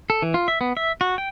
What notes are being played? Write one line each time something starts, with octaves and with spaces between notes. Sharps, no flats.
A4
E3
F4
E5
B3
E5
F#4
G5